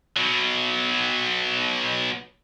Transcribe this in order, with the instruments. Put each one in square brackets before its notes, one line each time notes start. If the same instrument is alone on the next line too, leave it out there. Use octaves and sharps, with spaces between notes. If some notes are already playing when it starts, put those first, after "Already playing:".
[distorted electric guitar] B2 F#3